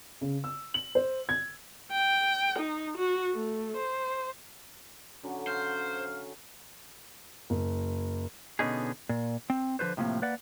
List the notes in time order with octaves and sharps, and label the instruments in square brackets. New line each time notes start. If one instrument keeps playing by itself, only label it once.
[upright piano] C#3
E6
F#7
C5
G#6
[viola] G5
D#4
F#4
A3
C5
[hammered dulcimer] D3 F#3 C#4
[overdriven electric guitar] C5 [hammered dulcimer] E5 [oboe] F5
[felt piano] F#1
[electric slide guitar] B2 D3 B3 C#4 D#4 G#4
A#2
C4
D3 F3 F4 B4 C5
A2 C3 F3 G3 A#3
A#3 B4 D5 F#5